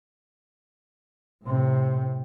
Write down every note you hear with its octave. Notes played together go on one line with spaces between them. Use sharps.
A2 C3